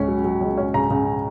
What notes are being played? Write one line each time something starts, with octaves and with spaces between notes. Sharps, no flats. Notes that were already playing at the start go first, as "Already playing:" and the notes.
Already playing: C#2 C#4
F#3
F#3
C#2
C#4
C#3 A#5
C#3